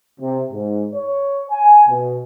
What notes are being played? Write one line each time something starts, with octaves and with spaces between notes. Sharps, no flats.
C3
G#2
C#5
G#5
B2